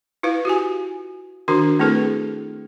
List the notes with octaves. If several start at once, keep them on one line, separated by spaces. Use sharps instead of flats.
E4 F4 B4 F5
F#4 G4 G#5
D#3 D4 F#4 A#4 A#5
A3 C4 E4 G#4 A4 B4